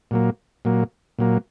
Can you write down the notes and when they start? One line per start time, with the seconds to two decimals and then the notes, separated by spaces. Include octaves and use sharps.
0.11 A#2 F#3 A#3
0.65 A#2 F#3 A#3
1.19 A#2 F#3 A#3